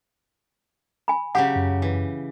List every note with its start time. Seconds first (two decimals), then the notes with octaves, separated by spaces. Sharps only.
1.08 G#5 B5
1.35 C#3 F#3 G4 F#5
1.56 F#2
1.82 E3